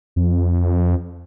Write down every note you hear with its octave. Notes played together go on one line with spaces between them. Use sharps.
F2